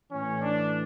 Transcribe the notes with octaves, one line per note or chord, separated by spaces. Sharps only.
A2 E3 C#4
D4